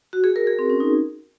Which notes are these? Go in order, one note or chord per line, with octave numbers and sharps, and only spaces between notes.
F#4
G#4
A#4
G#4
C4
C#4
D#4